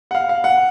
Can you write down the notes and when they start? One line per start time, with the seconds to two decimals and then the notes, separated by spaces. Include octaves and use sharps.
0.11 F#5
0.15 F5
0.29 F5
0.44 F#5